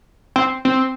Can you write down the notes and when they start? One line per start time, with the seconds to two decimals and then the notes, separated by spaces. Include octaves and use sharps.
0.36 C4
0.65 C4